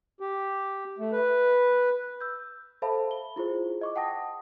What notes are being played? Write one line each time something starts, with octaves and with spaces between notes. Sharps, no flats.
G4
A3
B4
E6 G6
A4 C5 E5 F5 A5 B5
G7
E4 F4 G#4 C5
D#5 C#6 D6
F#5 G5 A5 D#6 A#6